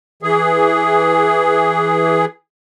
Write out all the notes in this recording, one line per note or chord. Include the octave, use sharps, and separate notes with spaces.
E3 G#4